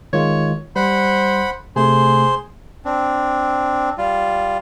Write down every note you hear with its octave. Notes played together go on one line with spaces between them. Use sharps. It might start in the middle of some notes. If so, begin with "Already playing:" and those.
D#3 G#3 F4 C#5
G3 C5 F#5 B5
C3 A3 G#4 C5
C4 D4
G3 F4